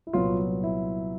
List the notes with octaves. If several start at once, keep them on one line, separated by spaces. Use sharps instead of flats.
E4
C2 A#2 F#3 B3 F4
E4